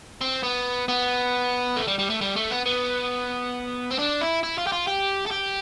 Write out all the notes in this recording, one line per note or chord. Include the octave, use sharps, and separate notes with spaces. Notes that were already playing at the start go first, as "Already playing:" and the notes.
C4
B3
B3
A3
G3
G3
A3
G3
A3
B3
B3
C4
D4
E4
E4
F4
G4
F4
G4
A4
G4